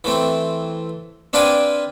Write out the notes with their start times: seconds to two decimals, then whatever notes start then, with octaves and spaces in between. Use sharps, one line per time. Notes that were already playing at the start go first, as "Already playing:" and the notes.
0.04 E3 A3 C4
1.33 C4 D4 B4 F5 G5 G#5